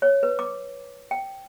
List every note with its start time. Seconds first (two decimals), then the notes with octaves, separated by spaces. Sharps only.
0.02 C#5
0.23 B4
0.39 D6
1.11 G5